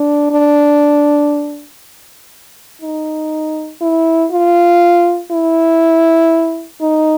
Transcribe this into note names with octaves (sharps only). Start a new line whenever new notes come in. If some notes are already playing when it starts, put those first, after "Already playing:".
Already playing: D4
D4
D#4
E4
F4
E4
D#4